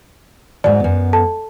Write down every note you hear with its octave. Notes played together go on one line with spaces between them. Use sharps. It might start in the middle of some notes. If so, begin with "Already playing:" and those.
G#2 F#3 D5
F#2 B3
A4 A5